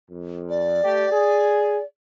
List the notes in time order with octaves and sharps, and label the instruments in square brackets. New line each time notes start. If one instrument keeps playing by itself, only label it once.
[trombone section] F2
[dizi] D5
[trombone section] A3 G4
G#4